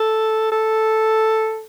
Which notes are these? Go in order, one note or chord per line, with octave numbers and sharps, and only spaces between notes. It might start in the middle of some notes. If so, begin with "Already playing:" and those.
Already playing: A4
A4